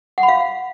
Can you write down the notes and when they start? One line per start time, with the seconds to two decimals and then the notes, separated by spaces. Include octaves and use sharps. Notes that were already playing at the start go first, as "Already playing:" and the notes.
0.18 F#5
0.23 B5
0.28 F5